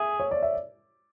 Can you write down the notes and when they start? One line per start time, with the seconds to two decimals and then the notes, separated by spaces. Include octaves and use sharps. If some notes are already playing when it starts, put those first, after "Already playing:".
Already playing: G#4 E5
0.20 C#5
0.31 D5
0.43 E5